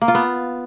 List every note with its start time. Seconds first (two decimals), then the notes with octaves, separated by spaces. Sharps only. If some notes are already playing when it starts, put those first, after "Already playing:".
0.02 A#3
0.08 F4
0.15 B3